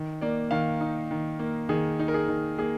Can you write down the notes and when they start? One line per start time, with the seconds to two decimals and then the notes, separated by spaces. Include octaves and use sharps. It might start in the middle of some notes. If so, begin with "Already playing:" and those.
Already playing: D#3
0.21 A#3 D5
0.51 D#3 F5
0.81 D#4
1.11 D#3
1.39 A#3
1.69 D#3 G#4
1.99 D#4
2.08 A#4
2.14 G#4
2.28 D#3
2.58 A#3 G#4